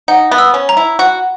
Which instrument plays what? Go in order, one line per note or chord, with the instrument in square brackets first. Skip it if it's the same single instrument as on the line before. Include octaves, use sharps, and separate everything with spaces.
[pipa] D#4 [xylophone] F#5
[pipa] B3
[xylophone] E6
[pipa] C#4
[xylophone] A#5
[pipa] E4
[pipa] F#4 [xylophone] F#5